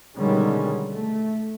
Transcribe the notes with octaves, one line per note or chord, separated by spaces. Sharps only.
B2 D3 D#3 G3 G#3 C#4
A3